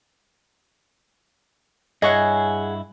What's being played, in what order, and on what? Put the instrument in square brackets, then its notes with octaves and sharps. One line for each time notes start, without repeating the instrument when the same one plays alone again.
[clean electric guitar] G2 E4 [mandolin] G#4 C#5 F#5 [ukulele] D#5